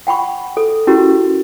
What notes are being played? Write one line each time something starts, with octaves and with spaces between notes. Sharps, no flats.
F#5 G5 B5 C#6
A4
C#4 E4 F#4 G4 A#4